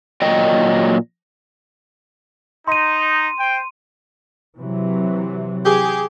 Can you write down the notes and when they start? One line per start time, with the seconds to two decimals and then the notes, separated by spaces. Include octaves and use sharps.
0.22 A#2 F#3 D#5 G5
2.68 D#4 C6 D#7
3.38 C5 G5
4.57 C3 E3 F#3
5.66 G4 G#4